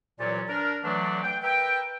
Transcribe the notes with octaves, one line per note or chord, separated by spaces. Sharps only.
C2 A#2 E3 F#3 C#4 D5
D4 A#4
D3 E3 F#3 A3 D4
G5
A#4 B4 E5 G5